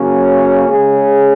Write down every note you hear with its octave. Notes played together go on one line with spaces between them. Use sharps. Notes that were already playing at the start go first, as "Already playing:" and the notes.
Already playing: C#3 F#3 A#3 C#4
C#3 G#3 C#4 G#4